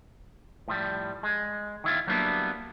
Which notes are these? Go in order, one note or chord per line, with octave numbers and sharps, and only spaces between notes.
A2 F3 G3
G#3
D#3 E4 F4
F#3 G3 A#3 B3 D4 E4